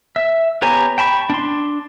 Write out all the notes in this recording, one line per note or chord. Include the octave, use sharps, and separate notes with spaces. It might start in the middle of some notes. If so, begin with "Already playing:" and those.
E5
B3 G4 C#5 G#5 A#5
G5 A5 B5 C#6
D4 C6